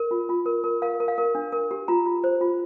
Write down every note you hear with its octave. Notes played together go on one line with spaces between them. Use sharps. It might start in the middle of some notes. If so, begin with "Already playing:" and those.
Already playing: A#4
F4
F4
A#4
A#4
A#4 F5
A#4
F5
A#4
D4
A#4
G4
F4 A#5
F4
C5
F4